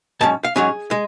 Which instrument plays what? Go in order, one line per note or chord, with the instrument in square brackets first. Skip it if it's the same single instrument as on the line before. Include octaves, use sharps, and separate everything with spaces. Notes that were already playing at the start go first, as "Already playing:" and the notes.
[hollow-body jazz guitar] G#2 F#3 C#4 A5
F5
G#2 F#3 C#4 G#4
G#3